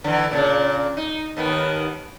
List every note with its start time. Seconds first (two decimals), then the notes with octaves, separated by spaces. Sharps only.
0.04 D3 E3
0.31 A#2 C#3 D4
0.97 D#4
1.37 D#2 D#3 B3